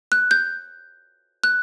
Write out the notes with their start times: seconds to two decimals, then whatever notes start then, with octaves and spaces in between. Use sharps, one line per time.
0.12 F#6
0.31 G6
1.44 F#6